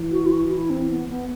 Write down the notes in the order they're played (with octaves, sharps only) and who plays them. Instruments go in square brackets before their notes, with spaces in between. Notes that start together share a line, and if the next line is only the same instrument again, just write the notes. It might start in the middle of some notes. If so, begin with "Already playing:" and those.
Already playing: [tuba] E3
[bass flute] F#4
E4
F#4
E4
C4
B3
B3